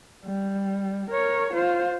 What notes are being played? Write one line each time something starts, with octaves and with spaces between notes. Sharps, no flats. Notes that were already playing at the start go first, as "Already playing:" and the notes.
G3
A#4 C#5
F4 C5